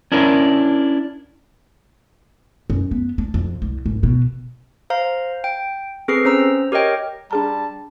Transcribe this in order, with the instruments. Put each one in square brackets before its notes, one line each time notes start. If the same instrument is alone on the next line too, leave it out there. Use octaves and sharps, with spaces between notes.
[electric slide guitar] C#4 D4 E4 A#4
[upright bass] F#2
B3
D4
F2
C2
G#1
B2
[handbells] C5 F5 A#5
G5
C4 G#4 A4 B4 C7
C#4 C5 A#5 E6
G4 A#4 C#5 D#5 G5
[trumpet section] G3 A5 [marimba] D4 G#4 A#5